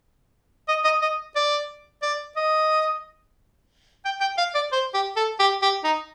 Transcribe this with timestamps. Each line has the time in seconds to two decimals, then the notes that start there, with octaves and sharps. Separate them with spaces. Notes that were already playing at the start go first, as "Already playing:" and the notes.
0.68 D#5
0.84 D#5
1.02 D#5
1.36 D5
2.02 D5
2.36 D#5
4.05 G5
4.21 G5
4.38 F5
4.55 D5
4.72 C5
4.94 G4
5.16 A4
5.40 G4
5.62 G4
5.84 D#4